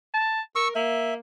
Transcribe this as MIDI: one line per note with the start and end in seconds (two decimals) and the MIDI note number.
0.14 0.41 81
0.56 0.72 70
0.56 0.68 85
0.56 0.68 88
0.75 1.18 58
0.75 1.14 76